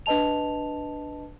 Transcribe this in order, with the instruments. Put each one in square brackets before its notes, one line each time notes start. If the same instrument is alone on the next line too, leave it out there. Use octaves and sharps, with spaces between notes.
[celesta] D4 B4 D#5 A5 F7